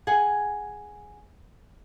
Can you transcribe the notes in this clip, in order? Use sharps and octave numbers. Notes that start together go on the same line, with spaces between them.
G#4 F#5 G#5